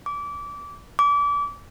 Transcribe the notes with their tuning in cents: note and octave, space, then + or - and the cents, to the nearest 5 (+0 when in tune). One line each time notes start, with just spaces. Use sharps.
D6 -25
D6 -30